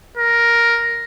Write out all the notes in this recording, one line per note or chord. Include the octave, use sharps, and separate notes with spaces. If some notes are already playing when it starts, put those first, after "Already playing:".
A#4